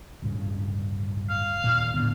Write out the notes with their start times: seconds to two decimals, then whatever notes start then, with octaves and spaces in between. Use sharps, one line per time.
0.22 D1 G2 C#3
1.30 F5
1.64 D#2 A#2
1.94 A2 D3 B3